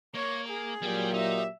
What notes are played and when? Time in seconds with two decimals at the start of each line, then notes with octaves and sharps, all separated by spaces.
0.15 A#3 C#5
0.49 G#4
0.83 A#2 F#3 G3 G4 G5
1.14 D#4 E5